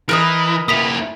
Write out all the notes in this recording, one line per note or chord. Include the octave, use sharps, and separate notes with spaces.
E3 A#4 B4 D#5
A#3 E4 D#6 B6 F7